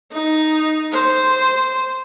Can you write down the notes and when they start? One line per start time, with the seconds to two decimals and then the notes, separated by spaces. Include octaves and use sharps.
0.12 D#4
0.92 C5